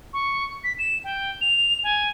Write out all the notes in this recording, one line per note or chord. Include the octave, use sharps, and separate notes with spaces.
C#6
B6
E7
G5
F7
G#5